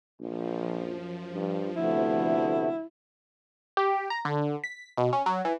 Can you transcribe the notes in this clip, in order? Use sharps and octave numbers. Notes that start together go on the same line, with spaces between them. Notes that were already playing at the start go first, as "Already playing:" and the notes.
A#1 F3
F#2
G2
D2 C3 A3 B3 E4
G4
A#5
D3
B6
B2
C#4
F#3
E3